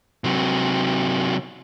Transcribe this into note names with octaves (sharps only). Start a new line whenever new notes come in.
C3 F#3